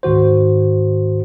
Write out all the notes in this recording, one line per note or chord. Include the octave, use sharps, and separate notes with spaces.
D2 G#2 D#3 F#4 C5